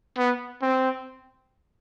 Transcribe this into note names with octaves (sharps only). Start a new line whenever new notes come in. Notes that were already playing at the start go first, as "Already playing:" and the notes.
B3
C4